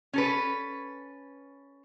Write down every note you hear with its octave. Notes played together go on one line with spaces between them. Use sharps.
C#4 A4 B4